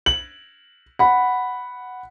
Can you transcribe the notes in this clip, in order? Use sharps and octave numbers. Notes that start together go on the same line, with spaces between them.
F#7
F#5 B5